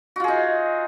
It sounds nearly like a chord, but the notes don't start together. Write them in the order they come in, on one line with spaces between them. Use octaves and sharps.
F#4 F4 G#4 D#4